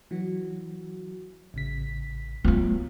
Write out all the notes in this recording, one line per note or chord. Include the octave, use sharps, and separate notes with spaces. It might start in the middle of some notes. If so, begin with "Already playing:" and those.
E3 F#3 F#4
A1 C#3 B6
F#3 A3 B3 F4